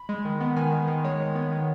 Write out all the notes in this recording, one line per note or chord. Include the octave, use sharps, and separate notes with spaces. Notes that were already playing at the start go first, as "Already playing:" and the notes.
Already playing: B5
G#3
D#3
B3
D#3 G#5
G#3
D#3
G#3 C#5
D#3
B3
D#3